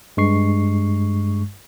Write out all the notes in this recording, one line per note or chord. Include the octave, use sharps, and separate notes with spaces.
G2 G#3 C#6 C7